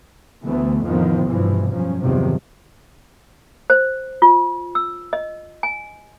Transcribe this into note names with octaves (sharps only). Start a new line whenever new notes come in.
D2 E3 A3 B3
F2 A2 D3 D#3 F3 B3
F1 G2 B2 E3 F3
G2 F3 F#3 C#4
E2 G2 C3 D#3 F3 F#3
C5
F4
E6
D#5
G#5